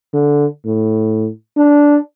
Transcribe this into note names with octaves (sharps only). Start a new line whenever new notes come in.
D3
A2
D4